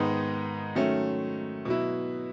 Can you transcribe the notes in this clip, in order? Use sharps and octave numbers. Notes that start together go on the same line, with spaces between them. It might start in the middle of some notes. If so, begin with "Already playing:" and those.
Already playing: G#2 D#3 G#3 B3 D#4
D#3 F#3 A3 C#4
B2 F#3 B3 E4